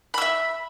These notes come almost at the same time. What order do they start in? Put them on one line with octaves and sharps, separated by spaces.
B5 E6 E5